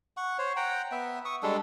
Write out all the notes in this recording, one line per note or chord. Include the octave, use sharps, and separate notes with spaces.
F#5 C#6
C5 C#5
F#5 G5 A#5
B3 E5
C#6 D#6
G3 G#3 D4 A4